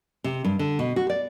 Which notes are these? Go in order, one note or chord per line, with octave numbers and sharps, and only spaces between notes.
C3
G2
D3
B2
F#4
D5